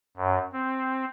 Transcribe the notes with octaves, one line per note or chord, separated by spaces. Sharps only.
F#2
C4